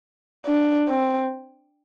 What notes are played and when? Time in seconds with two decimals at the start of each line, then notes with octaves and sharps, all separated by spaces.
0.46 D4
0.88 C4